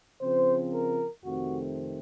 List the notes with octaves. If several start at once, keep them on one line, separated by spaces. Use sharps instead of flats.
C#3 F3 C4 C5
A#4
F2 C3 D#3 A3 C4 F#4